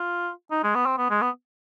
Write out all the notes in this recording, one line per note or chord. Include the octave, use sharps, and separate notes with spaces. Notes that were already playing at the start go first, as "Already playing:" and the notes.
Already playing: F4
D#4
G#3
B3
C4
B3
G#3
B3